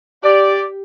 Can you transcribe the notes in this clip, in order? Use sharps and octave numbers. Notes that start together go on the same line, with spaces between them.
G4 D5